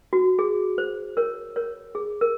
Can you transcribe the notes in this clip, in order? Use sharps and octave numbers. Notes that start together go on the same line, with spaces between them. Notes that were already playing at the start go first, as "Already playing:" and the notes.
F#4
G#4
C5
A#4 C#5
A#4 C#5
G#4
A#4